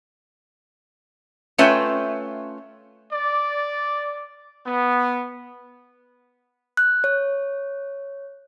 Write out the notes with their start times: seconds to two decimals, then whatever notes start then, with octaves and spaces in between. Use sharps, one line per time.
1.58 A3 C#4 F4 B4 E5 G5
3.12 D5
4.65 B3
6.77 F#6
7.04 C#5